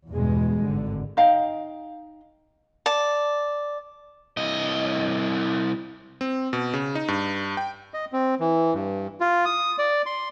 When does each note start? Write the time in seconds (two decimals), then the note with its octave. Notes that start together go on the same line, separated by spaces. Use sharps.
0.11 E2 G2 B2 G#3
0.64 G#1 D3
1.17 D#4 D#5 F5 G5
2.86 D5 A5
4.37 C2 D#5
6.21 C4
6.53 B2
6.73 C#3
6.95 D#4
7.08 G2
7.57 G5
7.94 D#5
8.12 C4
8.40 E3
8.74 G2
9.20 F4
9.45 D#6
9.79 D5
10.06 C6